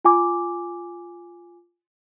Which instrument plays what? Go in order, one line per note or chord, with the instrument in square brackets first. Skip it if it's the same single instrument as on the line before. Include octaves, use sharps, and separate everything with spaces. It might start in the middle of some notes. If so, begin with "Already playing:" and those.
[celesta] F4 G#5 D6